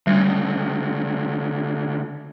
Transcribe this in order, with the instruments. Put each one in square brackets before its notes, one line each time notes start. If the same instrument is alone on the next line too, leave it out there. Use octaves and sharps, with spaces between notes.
[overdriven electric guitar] D2 C#3 [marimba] G3